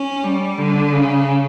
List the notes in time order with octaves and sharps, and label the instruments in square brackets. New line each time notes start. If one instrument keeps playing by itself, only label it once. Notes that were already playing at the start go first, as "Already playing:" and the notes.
Already playing: [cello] C#4
G3
D3
C#3